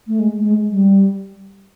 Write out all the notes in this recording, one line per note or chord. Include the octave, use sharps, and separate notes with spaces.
A3
G#3
A3
G#3
G3